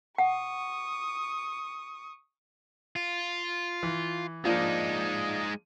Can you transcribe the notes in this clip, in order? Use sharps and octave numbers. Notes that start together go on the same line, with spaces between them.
F#5 C#6 D#6
F4
E3
F3 G#3 A#3 D4 D#4